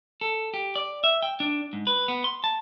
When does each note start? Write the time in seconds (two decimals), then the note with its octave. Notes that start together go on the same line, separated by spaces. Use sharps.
0.21 A4
0.54 G4
0.75 D5
1.04 E5
1.23 G5
1.40 D4
1.73 G#2
1.87 B4
2.08 B3
2.24 C6
2.44 A5